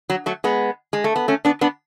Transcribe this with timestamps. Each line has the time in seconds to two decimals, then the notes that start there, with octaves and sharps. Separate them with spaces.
0.10 F#3
0.26 F#3 A3
0.44 G#3 B3
0.93 G#3
1.04 A3
1.16 B3
1.28 A3 C#4
1.45 B3 D4
1.61 B3 D4